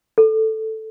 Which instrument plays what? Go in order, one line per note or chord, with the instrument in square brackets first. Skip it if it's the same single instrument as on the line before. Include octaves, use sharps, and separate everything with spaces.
[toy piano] A4